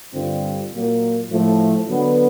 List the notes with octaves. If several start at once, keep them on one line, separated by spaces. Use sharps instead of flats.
G2 D3 G3 C4 F4
A#2 F#3 A#3
A2 F3 A3
D3 F#3 B3